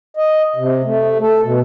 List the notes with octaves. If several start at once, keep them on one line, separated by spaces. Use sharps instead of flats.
D#5
C3
A3
A4
B2